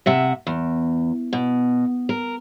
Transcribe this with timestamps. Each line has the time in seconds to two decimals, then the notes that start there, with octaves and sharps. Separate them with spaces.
0.06 C3 E5 F#5
0.47 E2
1.33 B2
2.09 A#4